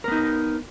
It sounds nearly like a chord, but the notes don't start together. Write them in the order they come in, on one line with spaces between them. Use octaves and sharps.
A#4 B3 D#4